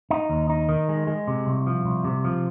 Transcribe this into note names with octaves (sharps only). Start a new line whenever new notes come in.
D#4
D#2
D#4
D#3
G#3
G#3
C3
C2
F3
C2
C3
F3